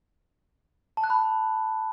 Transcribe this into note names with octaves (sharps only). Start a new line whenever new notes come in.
A5
F#6
B5